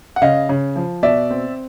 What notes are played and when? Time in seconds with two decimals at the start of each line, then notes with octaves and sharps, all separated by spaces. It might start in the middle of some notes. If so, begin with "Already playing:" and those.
0.16 F#5
0.22 C#3 D#5 F5
0.49 C#3
0.76 F3
1.03 B2 D5 E5
1.30 C4